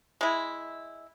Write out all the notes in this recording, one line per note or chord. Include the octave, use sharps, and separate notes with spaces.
G#3 E4